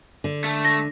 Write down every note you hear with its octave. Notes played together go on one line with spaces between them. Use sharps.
D3
A3
A#6